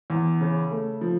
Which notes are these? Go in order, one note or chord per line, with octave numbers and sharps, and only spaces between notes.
E2
C#3
A3
F3